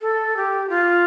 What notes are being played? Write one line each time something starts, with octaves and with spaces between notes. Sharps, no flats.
A4
G4
F4